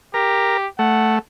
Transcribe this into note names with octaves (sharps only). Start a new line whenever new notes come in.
G4 A#4
A3 F#5